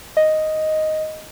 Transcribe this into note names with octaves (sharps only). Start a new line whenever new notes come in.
D#5